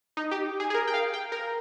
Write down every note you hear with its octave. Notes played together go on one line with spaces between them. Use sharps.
D#4
G4
G#4
G#4
A#4
G5
F5
G5
A#4